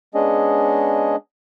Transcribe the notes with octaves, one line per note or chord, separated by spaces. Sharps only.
G#3 B3 C#4 D4 G#4 D#5